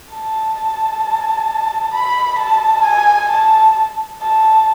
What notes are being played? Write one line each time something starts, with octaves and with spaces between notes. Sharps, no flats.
A5
B5
A5
G#5
A5
A5